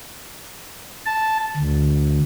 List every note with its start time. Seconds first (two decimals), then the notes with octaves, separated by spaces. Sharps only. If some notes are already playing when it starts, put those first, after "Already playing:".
1.06 A5
1.57 D2